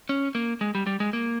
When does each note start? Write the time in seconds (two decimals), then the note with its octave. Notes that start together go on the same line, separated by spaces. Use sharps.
0.09 C#4
0.35 A#3
0.61 G#3
0.75 G3
0.87 G3
1.00 G#3
1.13 A#3